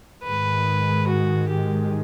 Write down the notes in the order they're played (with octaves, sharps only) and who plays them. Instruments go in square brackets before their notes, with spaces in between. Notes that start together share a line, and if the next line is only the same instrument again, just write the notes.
[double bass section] G#2 D#3 G#3 [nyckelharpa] B4
[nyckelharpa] F#4
G4